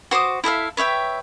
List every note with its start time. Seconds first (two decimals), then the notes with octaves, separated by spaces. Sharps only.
0.11 F#4 C5 D6 D#6
0.44 E4 A4 E5 F5
0.77 B4 C#5 E5 G5